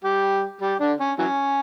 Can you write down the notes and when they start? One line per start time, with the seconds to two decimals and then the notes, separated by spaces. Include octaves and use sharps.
0.04 G3 G4
0.61 G3 G4
0.80 D3 D4
0.99 C#4
1.18 E3 F#3 C#4